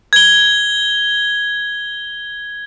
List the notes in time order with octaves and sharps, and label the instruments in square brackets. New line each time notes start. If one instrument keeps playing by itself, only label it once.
[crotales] G#6 G7